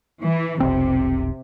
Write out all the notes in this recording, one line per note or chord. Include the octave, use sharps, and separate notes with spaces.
E3
F1 B1 C3 C4